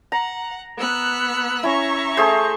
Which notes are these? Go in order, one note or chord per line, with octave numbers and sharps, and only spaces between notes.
F#5 A#5
B3 E6 F#6
C#4 E4 E5 A#5 C#6
A3 G#4 C5